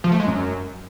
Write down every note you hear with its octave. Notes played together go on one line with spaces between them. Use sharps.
F3
A3
G#3
F#2